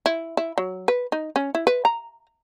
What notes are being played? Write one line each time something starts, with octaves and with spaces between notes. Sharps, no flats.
E4
E4
F#3
B4
D#4
C#4
E4
B4
A#5